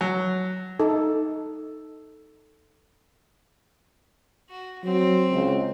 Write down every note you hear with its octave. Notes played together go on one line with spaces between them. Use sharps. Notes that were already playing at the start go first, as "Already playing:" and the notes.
F#3
D#4 A4
F#4
F#3 C4
C#2